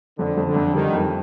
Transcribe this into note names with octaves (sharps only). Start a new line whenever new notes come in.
F2 D3
F2
D3
F2
D#3 G3
F2